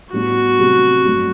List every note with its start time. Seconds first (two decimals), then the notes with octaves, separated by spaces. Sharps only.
0.13 A2 G3 B3 D4 F#4
0.59 C3 F#3 A3 C4 G4
1.05 G2 F#3 A3